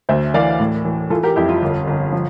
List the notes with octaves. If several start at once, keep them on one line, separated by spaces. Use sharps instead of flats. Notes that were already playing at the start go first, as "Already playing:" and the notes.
D2 C5 E5
E3 D5 F5
A2
E3
E3 F4 A4
G4 A#4
F2 E4 G4
F4
G1
G1
F3